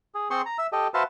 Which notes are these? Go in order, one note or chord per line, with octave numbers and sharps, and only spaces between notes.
G#4
C4 G#4 C5 C6 C#6
A#5
E5 E6
G4 A4 D#5
F#4 B4 C5 E5 F5 A5